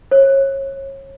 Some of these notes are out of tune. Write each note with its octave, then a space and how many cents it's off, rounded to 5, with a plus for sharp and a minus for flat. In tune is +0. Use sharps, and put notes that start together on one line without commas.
C#5 -30